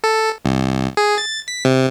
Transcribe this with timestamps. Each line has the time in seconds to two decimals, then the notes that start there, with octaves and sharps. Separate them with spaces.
0.04 A4
0.45 C2
0.97 G#4
1.18 A6
1.48 B6
1.65 C3